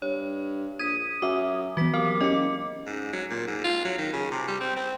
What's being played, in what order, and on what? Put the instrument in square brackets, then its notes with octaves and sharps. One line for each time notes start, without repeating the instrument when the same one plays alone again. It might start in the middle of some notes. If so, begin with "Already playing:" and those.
[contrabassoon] G2 [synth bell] C#5
[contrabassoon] A#1 [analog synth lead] D#6 [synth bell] G#6 B6 [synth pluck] D#7
[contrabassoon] F#2 [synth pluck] F#4 E5 [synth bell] D6
[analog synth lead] E3 [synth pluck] F#3 B3 [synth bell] F#4 B6
[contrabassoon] C3 [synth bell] A#4 [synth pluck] F5 [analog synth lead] D6
[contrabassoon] F#1 [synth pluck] C#4 G4 [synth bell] D#5 C#7
[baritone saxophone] G#2
F#3
A#2
G#2
F4
F#3
D#3
C#3
C3
G3
C4
C4